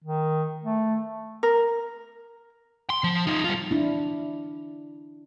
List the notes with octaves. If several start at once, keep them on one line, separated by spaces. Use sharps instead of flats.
D#3
A3
A#4
C6
F3
D#4 F4
G3 F4
D4 E4